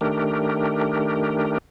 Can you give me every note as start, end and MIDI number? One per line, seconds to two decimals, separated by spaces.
0.01 1.58 51
0.01 1.58 57
0.01 1.58 62
0.01 1.58 67
0.01 1.58 70